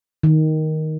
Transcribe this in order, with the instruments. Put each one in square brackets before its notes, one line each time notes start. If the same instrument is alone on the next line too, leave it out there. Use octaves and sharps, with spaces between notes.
[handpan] D#3